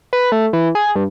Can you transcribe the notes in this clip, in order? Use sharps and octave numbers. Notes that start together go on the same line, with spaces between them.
B4
A3
E3
G#4
G2